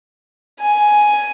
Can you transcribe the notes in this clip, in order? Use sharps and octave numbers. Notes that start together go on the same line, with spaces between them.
G#5